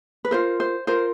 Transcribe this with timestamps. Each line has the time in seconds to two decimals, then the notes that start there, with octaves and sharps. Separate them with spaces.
0.25 B4
0.31 F4 A#4 C5
0.60 C5
0.87 F4 A#4 C5